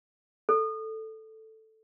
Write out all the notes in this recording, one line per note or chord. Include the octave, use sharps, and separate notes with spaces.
A4